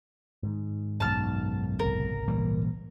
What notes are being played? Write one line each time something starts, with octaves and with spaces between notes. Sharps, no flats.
G#2 D#3
B1 F#2 A5 F6
G#1 C#2 C3 A#4
A#2 E3 G3